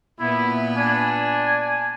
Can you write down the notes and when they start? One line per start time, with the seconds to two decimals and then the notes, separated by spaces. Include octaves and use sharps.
0.20 A#2 B3 E4 B4
0.77 D4 G#5